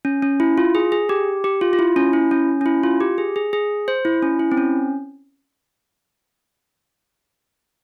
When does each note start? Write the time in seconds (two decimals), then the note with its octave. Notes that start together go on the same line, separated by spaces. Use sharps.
0.05 C#4
0.22 C#4
0.40 E4
0.58 F4
0.75 G#4
0.92 G#4
1.09 G4
1.44 G4
1.61 F4
1.73 F4
1.79 E4
1.96 C#4
2.13 E4
2.31 C#4
2.61 C#4
2.66 E4
2.83 F4
3.01 G4
3.18 G#4
3.36 G#4
3.53 G#4
3.88 C5
4.05 E4
4.23 C#4
4.39 E4
4.52 C4
4.57 C#4